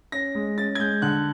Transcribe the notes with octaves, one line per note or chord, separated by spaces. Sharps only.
C#4 A#6
G#3
C#4 A6
G#6
G#3 G6
D3 F#6